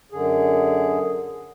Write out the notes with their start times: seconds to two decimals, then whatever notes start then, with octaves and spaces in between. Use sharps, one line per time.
0.12 F#2 D3 G#4